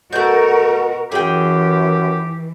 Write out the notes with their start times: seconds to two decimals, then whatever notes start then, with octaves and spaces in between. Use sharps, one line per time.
0.13 B2 A3 F#4 A#4 G6
1.12 F#2 E3 G4 G#4 G5